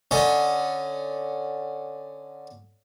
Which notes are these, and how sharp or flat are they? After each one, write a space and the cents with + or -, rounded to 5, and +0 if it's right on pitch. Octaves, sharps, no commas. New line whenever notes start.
D3 +5 C#4 +0 D#5 +25